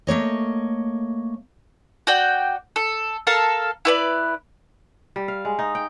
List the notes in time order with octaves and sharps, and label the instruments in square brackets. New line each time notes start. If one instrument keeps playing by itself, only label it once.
[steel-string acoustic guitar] A3 A#3 C#5 D#5
[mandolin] F#4 D5 G5
A4
A4 A#4 F5 A5
E4 B4 D5
[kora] G3
F5
G#3
D#4
G5